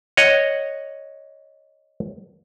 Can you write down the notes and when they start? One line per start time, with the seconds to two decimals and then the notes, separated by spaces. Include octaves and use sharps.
0.17 C#5 D#5 F#5